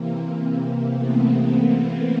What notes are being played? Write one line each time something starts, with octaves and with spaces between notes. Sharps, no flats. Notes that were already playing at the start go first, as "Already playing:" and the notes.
Already playing: C3 E3 A#3 C4
A3 B3